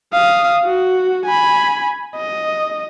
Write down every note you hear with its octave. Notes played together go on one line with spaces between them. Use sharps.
F5 D#6
F#4
G#5 B5
D#5